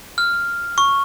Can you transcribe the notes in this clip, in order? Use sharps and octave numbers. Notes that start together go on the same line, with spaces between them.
F6
C#6